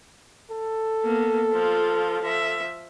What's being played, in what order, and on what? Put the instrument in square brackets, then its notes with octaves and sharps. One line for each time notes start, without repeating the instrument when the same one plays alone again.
[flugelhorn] A4
[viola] A#3 B3
F3 F4
F3 E5